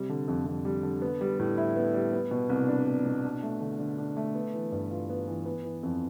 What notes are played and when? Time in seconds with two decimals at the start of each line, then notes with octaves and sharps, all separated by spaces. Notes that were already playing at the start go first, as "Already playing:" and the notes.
Already playing: C3 G3
0.09 D3
0.28 F2
0.46 F2
0.65 G3
0.83 D3
1.02 B3
1.21 G3
1.40 A2
1.58 E4
1.76 B3
1.94 G3
2.13 B3
2.31 B2
2.49 C2
2.68 D4
2.87 B3
3.06 B2
3.24 D4
3.43 A3
3.61 D3
3.79 D3
3.98 D4
4.17 A3
4.35 B3
4.54 E3
4.72 G2
4.91 F4
5.09 B3
5.27 E3
5.46 B3
5.64 E3
5.83 F2